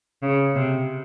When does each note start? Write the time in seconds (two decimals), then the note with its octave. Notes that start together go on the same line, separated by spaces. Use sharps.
0.23 C#3
0.55 C3